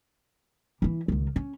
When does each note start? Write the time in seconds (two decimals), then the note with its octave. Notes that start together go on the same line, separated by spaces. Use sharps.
0.82 E3 E4
1.08 C#2 D#3
1.36 C#4